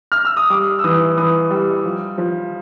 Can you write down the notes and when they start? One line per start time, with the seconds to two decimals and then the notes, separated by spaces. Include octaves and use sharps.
0.12 F6
0.25 E6
0.37 D#6
0.50 G3 D6
0.79 E6
0.84 E3 D#6
1.17 E3 D#6
1.50 G3
1.84 F3
2.18 F3